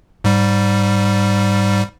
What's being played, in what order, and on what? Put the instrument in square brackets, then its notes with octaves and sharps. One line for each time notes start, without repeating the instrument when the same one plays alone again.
[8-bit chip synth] G#2 G3